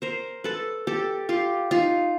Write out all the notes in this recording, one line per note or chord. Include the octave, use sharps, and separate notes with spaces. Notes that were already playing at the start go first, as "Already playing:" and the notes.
A#4 C5
A4 B4
G4 A4
F4 G4
D#4 F4